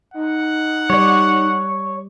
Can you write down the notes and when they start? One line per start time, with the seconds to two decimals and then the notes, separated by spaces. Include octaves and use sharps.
0.14 D#4 F#5
0.90 G3 C#5 D5